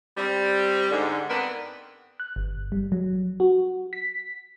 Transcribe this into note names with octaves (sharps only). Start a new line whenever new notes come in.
G3 C4
G#2 D3
G2 B3 C4 D4 A#4 B4
F#6
G1
G3
F#3
F#4
B6